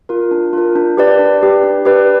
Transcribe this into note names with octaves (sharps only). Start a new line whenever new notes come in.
F4 A#4
D4
F4 A#4
D4
G4 B4 D5
D4
G4 B4 D5
D4
G4 B4 D5